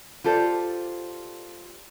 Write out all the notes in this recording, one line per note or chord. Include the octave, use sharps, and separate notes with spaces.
F4 G4 A4 C5 D5